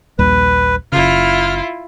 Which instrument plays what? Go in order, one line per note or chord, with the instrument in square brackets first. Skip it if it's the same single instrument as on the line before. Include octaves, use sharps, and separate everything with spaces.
[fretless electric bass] A#1 D#2 G3 [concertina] B4
[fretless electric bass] F#1 C#3 [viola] E4 F4 [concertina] F6